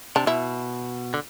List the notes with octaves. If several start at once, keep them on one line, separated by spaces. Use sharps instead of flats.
C3 D4
B2 E4
D3